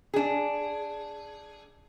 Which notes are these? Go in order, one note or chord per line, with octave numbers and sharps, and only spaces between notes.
D4 G#4